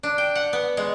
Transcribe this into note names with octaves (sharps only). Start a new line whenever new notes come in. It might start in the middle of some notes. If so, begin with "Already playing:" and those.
D4
G5
F#5
B3
G#3